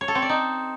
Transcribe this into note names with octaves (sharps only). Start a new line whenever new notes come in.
C#5
A4
C4
D5
D#4